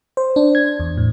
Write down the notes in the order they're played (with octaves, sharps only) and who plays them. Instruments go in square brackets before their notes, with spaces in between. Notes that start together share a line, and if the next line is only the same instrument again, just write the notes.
[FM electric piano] C5
D4
G#6
E2
A2